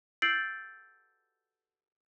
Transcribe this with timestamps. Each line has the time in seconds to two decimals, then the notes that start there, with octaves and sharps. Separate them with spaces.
0.22 E6 G6 A6 C7 D7 F#7